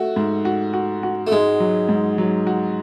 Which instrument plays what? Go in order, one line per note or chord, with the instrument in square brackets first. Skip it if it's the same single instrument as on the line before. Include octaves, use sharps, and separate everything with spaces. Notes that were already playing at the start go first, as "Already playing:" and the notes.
Already playing: [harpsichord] A3 [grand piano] F#4
[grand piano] G#2
F#4
F#4
F#4
[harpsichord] A3
[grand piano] G#2 [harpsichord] G#3
[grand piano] F#3
G#2
F#3
F#4